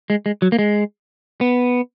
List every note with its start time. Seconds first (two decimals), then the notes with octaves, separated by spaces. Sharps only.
0.10 G#3
0.26 G#3
0.42 F#3
0.52 A#3
0.59 G#3
1.41 B3